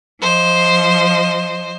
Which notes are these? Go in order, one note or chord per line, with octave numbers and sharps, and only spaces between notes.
F3 C5 D#5